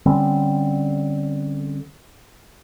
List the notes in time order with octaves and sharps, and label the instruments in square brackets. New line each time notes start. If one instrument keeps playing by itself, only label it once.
[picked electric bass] D3 G3 C4 C#4